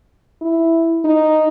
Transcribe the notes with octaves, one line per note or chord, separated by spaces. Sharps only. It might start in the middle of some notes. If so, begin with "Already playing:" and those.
E4
D#4